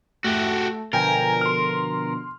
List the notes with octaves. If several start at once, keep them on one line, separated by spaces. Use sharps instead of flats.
A3 F#4 G4
B2 D3 F3 A#4 G5 G#5 A#5
C6 F6